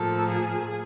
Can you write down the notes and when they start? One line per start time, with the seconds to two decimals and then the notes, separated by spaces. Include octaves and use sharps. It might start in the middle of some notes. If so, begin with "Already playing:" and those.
Already playing: A2 F3 A#3 A4
0.27 G#4